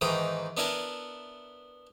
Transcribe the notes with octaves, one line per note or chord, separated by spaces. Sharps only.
G#2 D#3 E3 G5 D#6
B3 D4 E4 A#4 G#5 A5